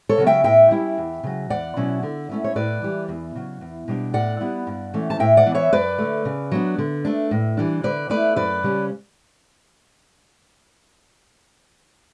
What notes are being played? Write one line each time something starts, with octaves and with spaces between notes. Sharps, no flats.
A4 C#5
C#3 F#3 B3
E5 G5
A2 E5 G5
G3 C#4 E4
E2
C#3 F#3
E2 D5 F#5
B2 F#3 C#4 E4
D3
A3 C#4 E4
C#5
A2 B4 D5
E3 G3
E2
C#3 F#3
E2
B2 G3 D4
A2 D5 F#5
G3 B3 E4
G2
E3 A3 C#4
A5
A2 E5 G5
D5 F#5
E3 B3
C#5 E5
F#2 B4 D5
D3 A3
C#3
F#3 B3 D4
D3
A3 D4
A2
E3 G3 D4
D3 B4 D5
A3 E4 B4 D5
F#2 B4 D5
C#3 G3 C#4